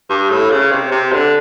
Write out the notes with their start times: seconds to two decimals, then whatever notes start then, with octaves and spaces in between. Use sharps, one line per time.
0.09 G2
0.30 A2
0.51 C#3
0.72 C3
0.91 C3
1.12 D3